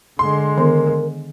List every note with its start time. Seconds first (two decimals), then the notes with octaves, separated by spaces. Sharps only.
0.19 D3 G#3 C6
0.58 D#3 B3 A#4